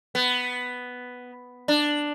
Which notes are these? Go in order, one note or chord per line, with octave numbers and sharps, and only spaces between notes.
B3
D4